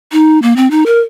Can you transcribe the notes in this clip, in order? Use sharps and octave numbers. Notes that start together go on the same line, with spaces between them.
D#4
A#3
C4
D#4
A#4